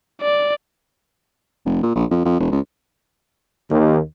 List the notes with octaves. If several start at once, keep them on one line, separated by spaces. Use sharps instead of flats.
D5
F1
A#2
A#1
F2
F2
E1
C#2
D#2